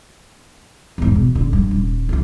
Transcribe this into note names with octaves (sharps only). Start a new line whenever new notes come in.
E2 G#2
B2
D#1 D3
G2
D#1
C#2 F#2